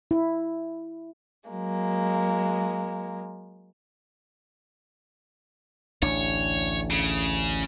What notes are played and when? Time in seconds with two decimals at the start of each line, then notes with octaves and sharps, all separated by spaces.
0.11 E4
1.48 F#3 G#3 A#3
6.03 A1 D2 D4 C#5
6.91 C#3